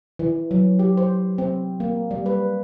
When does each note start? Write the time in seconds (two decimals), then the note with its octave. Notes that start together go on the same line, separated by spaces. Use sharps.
0.19 E3
0.51 F#3
0.79 G4
0.97 C5
1.38 C4
1.80 A#3
2.11 G3
2.26 B4